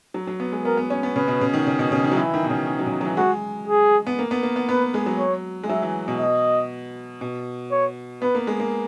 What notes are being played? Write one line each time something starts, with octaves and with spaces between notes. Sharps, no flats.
F#3
F#3
B3
G#3
B3 A#4
B3
C#4
B3
C#3 B4
B2
C#3
D#3
C#3
B2
C#3
D#3
F#3
E3 E4
D#3
B2
C#3
D#3
F#3
C#3
D#3
F#3
E3
G#3 F#4
G#4
B3
A#3
B3
A#3
B3
B3 B4
G#3
F#3
C#5
G#3
F#3 E5
E3
B2
D#5
B2
C#5
B3 B4
A#3
G#3
A#3